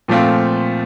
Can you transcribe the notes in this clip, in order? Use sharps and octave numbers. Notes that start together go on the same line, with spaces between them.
A#2 F3 A3 C4 F4